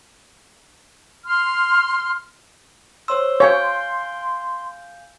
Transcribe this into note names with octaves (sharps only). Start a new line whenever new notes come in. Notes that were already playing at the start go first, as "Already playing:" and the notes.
C6 F6
C5 C#5 C6 E6
C#5 F5 G#5 G6